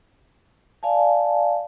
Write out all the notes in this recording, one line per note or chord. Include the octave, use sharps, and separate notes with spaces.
D5 F5 G#5 A5